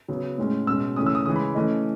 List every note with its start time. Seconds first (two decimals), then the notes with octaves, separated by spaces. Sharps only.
0.08 C#3 F#3 B3
0.38 A2 G#3 C#4
0.67 B2 G#3 C#4 E6
0.96 C#3 E3 A3 C#4 D#6
1.06 E6
1.15 D#6
1.26 C#3 E3 G#3 D#6
1.36 B5
1.55 E3 A3 C#4 D#5